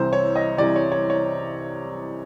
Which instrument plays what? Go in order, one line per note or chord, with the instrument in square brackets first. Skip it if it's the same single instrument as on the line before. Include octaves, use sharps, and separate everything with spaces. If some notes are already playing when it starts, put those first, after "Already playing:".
Already playing: [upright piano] C2 C3 E3 C5
C#5
D#5
C2 C3 E3 D5
C#5
C#5
C#5